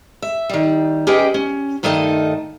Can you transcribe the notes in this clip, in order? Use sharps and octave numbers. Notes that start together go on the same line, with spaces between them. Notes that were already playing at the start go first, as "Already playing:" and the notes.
E5
D#3 G3
C#4 G4 G#4 B4 D#5 G5
C#4
G2 D#3 A3 D#4 D#5 A5